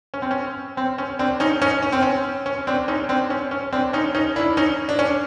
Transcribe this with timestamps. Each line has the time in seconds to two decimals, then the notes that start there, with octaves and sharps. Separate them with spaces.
0.14 C#4
0.22 C4
0.31 C#4
0.77 C4
0.98 C#4
1.19 C4 D4
1.40 C#4 D#4
1.62 C#4 D#4
1.82 C#4
1.92 C4
2.03 C#4
2.46 C#4
2.67 C4 D4
2.88 C#4 D#4
3.09 C4 D4
3.30 C#4
3.51 C#4
3.72 C4 D4
3.93 C#4 D#4
4.15 C#4 D#4
4.36 D4 E4
4.57 C#4 D#4
4.89 D4
4.99 C#4